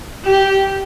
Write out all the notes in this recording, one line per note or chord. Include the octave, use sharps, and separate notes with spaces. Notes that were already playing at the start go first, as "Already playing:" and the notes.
G4